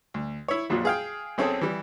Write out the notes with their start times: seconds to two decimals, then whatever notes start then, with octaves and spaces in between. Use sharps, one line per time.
0.14 D2
0.48 E4 C#5
0.70 A#1 F2 A#2 F#3
0.85 G#4 F5 G5
1.38 B1 C4 C#4 G#4 A4
1.61 E3 G3